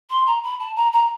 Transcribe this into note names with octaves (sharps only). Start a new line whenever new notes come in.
C6
A#5
B5
A5
A#5
A#5